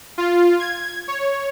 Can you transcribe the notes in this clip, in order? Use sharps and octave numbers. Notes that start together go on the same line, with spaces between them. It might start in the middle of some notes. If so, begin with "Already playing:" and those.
F4
G#6
C#5